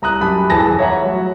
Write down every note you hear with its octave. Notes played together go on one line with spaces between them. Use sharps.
C2 A#5 D#6 F#6
F#2 G4 A5 B5
F1 E3 G#4 G#5 A5 A#6
C#5 E5 F#5 A#5
F#3